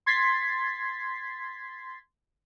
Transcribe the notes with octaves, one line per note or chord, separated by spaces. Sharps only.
C6 G#6 A6 B6 C7